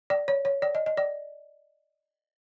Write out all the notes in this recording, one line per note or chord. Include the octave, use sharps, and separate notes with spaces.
D5
C#5
C#5
D5
D#5
D#5
D5